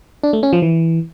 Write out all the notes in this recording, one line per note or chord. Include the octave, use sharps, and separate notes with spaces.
D4
A3
C#4
F3
E3